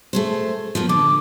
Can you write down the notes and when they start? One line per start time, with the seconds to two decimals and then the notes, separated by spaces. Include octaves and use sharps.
0.13 A3 G#4 C5
0.75 F3 A#3 B3
0.89 D3 D6